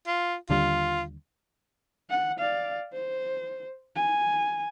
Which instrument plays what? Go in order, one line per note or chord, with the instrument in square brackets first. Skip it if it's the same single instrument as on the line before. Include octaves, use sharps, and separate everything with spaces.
[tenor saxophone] F4
[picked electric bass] D#2 D3 G3 [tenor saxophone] F4
[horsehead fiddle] F#5
D5 F5
C5
G#5